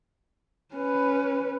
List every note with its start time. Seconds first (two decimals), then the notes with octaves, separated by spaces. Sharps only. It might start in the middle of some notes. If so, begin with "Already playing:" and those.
0.74 C#4 B4